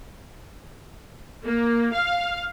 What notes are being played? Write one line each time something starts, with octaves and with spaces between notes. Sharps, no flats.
A#3
F5